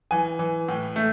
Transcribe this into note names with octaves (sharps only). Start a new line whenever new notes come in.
E3 G#5
E3
A2
A3